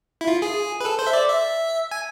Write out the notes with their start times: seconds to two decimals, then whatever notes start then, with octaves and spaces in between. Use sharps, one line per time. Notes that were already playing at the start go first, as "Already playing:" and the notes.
0.21 E4
0.27 F4
0.42 G#4
0.81 B4
0.85 A4
0.99 C5
1.07 E5
1.13 D5
1.28 E5
1.91 G#5